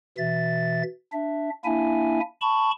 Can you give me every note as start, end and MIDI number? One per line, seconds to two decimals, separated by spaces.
0.18 0.83 47
0.18 0.83 52
0.18 0.83 76
0.18 0.83 93
1.12 1.50 62
1.12 1.50 76
1.65 2.20 58
1.65 2.20 62
1.65 2.20 64
1.65 2.20 76
1.65 2.20 80
2.41 2.71 81
2.41 2.71 83
2.41 2.71 85